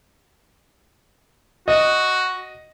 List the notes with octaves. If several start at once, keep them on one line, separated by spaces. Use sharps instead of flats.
F#4 D#5